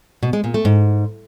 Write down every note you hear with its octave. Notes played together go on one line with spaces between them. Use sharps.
B2
G#3
A#2
A3
G#2